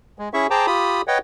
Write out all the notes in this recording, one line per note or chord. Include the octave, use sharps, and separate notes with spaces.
G#3
C#4 E4 G#4 E5 C#6
G#4 C5 G5 A5 A#5 D6
F4 G4 B5 D#6
B4 C#5 D#5 F#5 G5